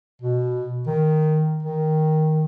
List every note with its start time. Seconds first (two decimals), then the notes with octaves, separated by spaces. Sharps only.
0.22 B2
0.87 D#3
1.63 D#3